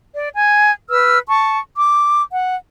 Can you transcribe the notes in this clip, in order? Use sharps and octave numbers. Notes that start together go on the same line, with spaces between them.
D5
G#5
B4 E6 F6
A5 C#6
D6
F#5